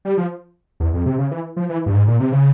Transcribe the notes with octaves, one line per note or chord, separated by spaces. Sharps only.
G3
F3
E2
F2
C3
C#3
E3
F3
E3
G2
G#2
A#2
C3
C#3